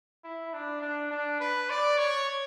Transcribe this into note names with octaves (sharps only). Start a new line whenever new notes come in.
E4
D4
D4
D4
B4
D5
C#5